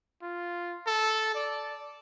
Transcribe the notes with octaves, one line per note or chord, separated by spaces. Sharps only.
F4
A4
D5